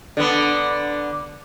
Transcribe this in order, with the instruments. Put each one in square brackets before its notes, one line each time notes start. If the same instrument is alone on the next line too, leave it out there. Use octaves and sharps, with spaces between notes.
[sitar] D3 B3